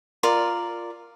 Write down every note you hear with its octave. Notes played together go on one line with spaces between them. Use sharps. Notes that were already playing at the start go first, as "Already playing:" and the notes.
F4 A#4 D5